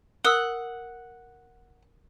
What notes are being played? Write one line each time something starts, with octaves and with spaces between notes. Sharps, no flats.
A#4 F#5 D#6 E6